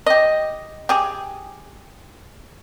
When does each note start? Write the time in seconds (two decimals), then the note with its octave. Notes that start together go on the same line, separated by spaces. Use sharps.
0.06 G4 D#5
0.89 G4 G#4